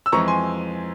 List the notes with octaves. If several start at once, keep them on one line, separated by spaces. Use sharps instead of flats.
E6
F2 E3 G#3 C4 A#5 C#6
G#5 C6